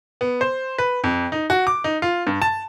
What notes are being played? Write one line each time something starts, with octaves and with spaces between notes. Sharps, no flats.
B3
C5
B4
F2
D#4
F#4
D6
D#4
F4
G2
A5